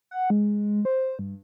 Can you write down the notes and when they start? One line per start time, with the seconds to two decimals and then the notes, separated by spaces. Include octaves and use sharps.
0.11 F#5
0.30 G#3
0.85 C5
1.19 G2